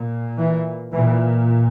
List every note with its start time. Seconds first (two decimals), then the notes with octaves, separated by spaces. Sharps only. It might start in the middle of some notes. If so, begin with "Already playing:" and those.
Already playing: A#2
0.37 E3
0.93 A#2 E3